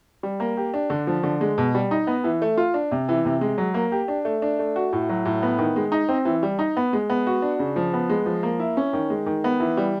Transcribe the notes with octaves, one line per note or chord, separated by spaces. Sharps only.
G3
A#3
G4
D4
D3
F3
D3
G#3
B2
G3
D#4
B3
E3
A3
F4
D4
C3
E3
C3
G#3
F#3
A#3
G4
D4
A3
D4
A3
F#4
A2
F#3
A2
B3
D#3
G#3
D#4
C4
E3
G3
D#4
B3
G#3
B3
F#4
D4
C#3
F3
B3
G#3
F3
A#3
E4
C#4
D#3
G#3
D#3
B3
E3
G3